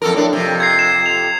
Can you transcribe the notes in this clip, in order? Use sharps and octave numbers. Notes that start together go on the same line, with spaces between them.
F2 A4 A#4
A2 D4
F2 C3
G#6 C7
E7
F7